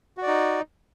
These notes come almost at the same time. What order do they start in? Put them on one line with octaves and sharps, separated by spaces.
F#4 D5 D#4